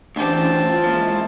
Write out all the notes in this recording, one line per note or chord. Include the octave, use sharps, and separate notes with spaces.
D2 E3 C4 C#4 G4 A5
F4
A#2 F3 G#3 E4